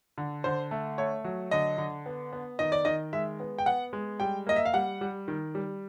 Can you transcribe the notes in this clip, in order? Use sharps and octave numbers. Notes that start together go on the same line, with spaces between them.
D3
D3 C5
A3
A3 C#5
F#3
D3 D#5
D3
B3
B3
D#3 D#5
D5
D#3 D#5
G#3 E5
B3
G5
B3 F#5
G#3
G3 G5
A#3 D#5
E5
F5
G3 F#5
G3
D#3
G3